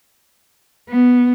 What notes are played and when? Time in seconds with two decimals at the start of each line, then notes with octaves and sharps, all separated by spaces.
0.90 B3